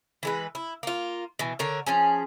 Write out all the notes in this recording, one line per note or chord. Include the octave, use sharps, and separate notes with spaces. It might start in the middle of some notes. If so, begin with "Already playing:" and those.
E3 G#3 B4
E4
A#3 F4
B2 E3
D3 A#4 C#5
F3 C#4 G#4